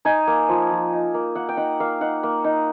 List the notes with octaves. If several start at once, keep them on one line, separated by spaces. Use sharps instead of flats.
D#4 G#5
A#3
F3
F3
D#4
A#3
A#3 F#5
G5
D#4 F#5
A#3 F5
D#4 F#5
A#3
D#4